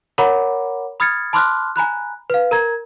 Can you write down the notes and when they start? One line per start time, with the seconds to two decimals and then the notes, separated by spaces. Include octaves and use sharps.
0.18 A#4 C#5 F#5 A#5 B5 D6
1.00 B5 D#6 F6 G#6 A6 C#7
1.33 A5 B5 C6 D6 F6 F#6
1.76 G#5 A#5 B5 F#6
2.30 B4 F5
2.51 A#4 A#5 G#6